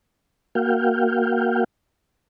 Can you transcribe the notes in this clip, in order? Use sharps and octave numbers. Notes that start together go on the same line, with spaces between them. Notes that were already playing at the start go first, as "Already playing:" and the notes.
A#3 F#4 F5 G5